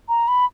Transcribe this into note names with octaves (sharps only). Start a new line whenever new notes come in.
A#5
B5